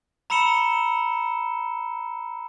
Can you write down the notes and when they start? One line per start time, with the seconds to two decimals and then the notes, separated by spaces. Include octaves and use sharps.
0.30 A#5 B5 E6 C#7 E7 G7